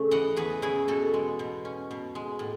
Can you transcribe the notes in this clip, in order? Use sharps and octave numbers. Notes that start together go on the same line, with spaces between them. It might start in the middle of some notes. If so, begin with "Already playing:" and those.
Already playing: C#3 A3
E3 D#5 F#5
E2 G#4 B4
C#3 E4 G#4
B2 F#4 A4
G#3
B2
C#4
B2
G#3
A2